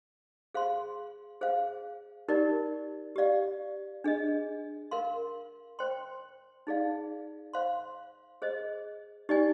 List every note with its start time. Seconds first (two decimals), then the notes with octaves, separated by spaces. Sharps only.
0.54 G#4 C5 F5 C6
1.41 G#4 C5 F5
2.28 D#4 G4 A#4 D5
3.16 G4 D5 F5
4.04 D4 G#4 D#5
4.91 A#4 F5 C6
5.79 C5 G5 C6
6.67 D#4 G#4 D5 F5
7.53 C5 F5 C6
8.42 G#4 C5 D#5
9.29 D#4 G4 D5 G#5